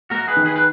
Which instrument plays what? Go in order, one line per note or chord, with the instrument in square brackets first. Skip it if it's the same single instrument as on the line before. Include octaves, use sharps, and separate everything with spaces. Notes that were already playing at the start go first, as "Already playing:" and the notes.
[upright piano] A#3 [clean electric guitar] F#4 A#4
[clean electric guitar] G#4 B4
[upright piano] D#3
[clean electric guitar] G#4 B4
B4